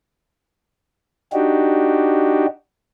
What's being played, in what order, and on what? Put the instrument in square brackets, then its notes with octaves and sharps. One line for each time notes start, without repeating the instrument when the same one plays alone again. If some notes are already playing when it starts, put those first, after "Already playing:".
[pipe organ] D4 D#4 F#4 G4